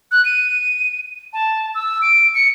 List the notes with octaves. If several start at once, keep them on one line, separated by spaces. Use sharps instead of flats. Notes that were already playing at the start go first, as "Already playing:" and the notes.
F#6
D#7
A5
E6
D7
C#7